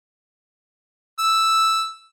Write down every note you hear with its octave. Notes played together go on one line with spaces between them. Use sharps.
E6